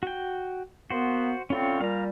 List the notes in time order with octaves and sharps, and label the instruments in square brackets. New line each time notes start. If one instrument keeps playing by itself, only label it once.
[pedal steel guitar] F#4 G5
[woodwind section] A#3 B3 [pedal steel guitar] F#4 C5
[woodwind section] A2 D3 C4 [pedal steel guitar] C#4 F4 C#5
[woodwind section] A#2 G3 [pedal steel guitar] F5 A#5